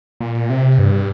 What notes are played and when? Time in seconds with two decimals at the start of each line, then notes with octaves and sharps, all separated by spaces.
0.20 A#2
0.50 C3
0.78 G2